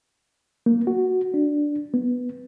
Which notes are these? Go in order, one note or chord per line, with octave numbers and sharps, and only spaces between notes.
A#3
F#4
D4
B3